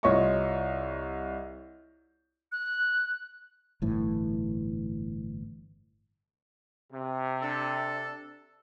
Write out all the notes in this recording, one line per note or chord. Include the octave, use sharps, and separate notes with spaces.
C2 F4 C#5 D#5 C#6
F#6
G1 A2 E3
C3
D4 A4